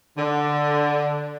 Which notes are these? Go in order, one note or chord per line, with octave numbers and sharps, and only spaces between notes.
D3